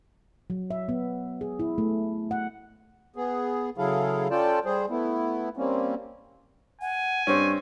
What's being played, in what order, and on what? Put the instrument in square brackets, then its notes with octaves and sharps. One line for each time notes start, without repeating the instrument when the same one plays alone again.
[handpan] F#3
E5
B3
G#4
E4
A3
F#5
[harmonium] B3 G#4
C#3 F#3 E4 G#4 A4 F5
C#4 F4 A4 D5 G5 A5
G3 G#4 C5
A3 B3 E4
G3 A#3 C4 C#4
[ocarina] F#5 [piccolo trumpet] G#5
[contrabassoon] G2 [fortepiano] C4 C#4 [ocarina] C#6